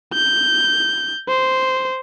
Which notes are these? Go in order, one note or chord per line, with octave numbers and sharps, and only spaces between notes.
G6
C5